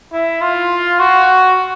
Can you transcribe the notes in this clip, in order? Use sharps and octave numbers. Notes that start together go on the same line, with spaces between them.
E4
F4
F#4